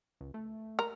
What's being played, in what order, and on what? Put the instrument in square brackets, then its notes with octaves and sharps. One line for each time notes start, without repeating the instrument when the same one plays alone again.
[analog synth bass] C#2
A3
[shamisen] A#4